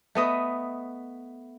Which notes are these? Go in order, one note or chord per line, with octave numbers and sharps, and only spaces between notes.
A3 B3 D#5